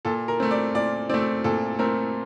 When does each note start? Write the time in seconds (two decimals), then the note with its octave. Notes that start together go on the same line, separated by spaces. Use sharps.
0.05 A#2 A4
0.28 A#4
0.40 A3 C4
0.51 D5
0.75 A#2 D5
1.10 A3 C4 D5
1.44 A#2 A4
1.79 A3 C4 A#4